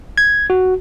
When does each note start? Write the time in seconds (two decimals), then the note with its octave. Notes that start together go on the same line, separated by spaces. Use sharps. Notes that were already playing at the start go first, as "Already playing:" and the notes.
0.18 G#6
0.50 F#4